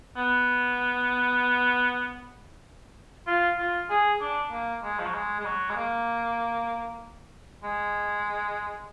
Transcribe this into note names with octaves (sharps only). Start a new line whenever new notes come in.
B3
F4
F4
G#4
D4
A#3
G#3
F3
F#3
G#3
G#3
F#3
G#3
A#3
G#3